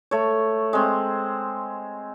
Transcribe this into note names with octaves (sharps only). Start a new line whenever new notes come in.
A3 C#5
G#3 C4